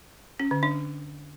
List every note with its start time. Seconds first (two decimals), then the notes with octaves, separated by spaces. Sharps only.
0.40 C#4
0.51 D3
0.63 D4